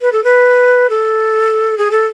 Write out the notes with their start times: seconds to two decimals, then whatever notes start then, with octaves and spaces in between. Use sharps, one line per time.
0.01 B4
0.12 A4
0.24 B4
0.89 A4
1.78 G#4
1.91 A4